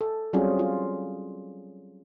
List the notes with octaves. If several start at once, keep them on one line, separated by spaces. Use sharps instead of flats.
A4
F#3 G3 C4 C#4 F4 G#4
F4